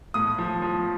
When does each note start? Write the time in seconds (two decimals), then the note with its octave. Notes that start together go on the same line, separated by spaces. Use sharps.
0.14 A2 D#6
0.38 F3
0.62 F3